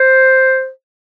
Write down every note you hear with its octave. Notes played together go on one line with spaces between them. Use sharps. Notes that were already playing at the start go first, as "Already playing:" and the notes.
Already playing: C5